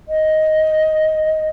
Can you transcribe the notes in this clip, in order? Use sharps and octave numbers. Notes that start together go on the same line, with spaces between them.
D#5